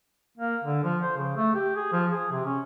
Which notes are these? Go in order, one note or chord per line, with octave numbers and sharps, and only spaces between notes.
A#3
D3
F3
C5
C#3
A3
G4
G#4
F3
G#4
C3
C#4